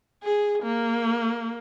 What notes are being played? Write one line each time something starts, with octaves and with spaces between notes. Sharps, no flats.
G#4
A#3